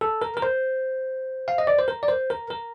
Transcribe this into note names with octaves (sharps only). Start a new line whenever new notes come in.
A4
A#4
A#4
C5
F5
D#5
D5
C5
A#4
D5
C5
A#4
A#4